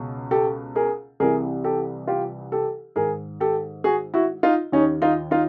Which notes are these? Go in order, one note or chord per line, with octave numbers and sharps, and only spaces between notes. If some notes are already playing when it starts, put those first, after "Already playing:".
Already playing: C#2 B2
G4 A4
G#4 A#4
C2 C3 E3 G#4 A#4
G4 A4
F4 G4
G4 A4
G#2 D#3 G#4 A#4
G4 A4
F#4 G#4
E4 F#4
D#4 F4
D#2 D#3 C#4 D#4
D#4 F4
D#4 F4